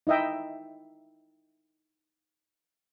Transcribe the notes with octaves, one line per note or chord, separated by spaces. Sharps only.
D#4 E4 D#5 E5 G5